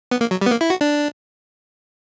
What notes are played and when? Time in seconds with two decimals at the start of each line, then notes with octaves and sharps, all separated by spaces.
0.11 B3
0.21 A#3
0.31 F#3
0.41 G3
0.46 B3
0.51 A#3
0.61 E4
0.70 F#4
0.81 D4